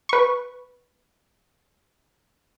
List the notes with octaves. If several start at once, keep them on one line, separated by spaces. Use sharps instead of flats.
B4 C#6